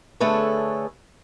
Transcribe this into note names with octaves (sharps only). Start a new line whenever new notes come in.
D3 A3 G#4 A4 B4 C#5